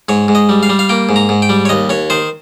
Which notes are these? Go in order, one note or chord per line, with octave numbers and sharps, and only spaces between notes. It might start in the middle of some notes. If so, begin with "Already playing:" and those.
G#2 C#5
G#2
D#5
G3
F5
G3
F5
A#3 G5
G#2
A#5
G#2
G5
G3
C#5
D#2 D#5
D#2 C#5
D#3 C5